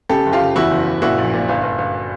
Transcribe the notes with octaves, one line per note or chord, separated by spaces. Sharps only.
C#3 G4 A4
F#1
F4 G4
F#1
E2 E4 F#4
F#1
F#1
A#2 E4 F#4
A#1
A#2
G1
G1
G1